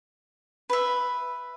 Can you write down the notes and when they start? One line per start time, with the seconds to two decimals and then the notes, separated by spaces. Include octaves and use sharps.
0.70 B4 E5